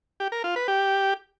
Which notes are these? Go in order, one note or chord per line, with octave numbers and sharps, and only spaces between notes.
G4
A#4
F4
B4
G4